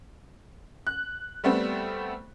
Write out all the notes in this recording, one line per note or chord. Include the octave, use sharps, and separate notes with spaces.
F#6
G3 A3 B3 C4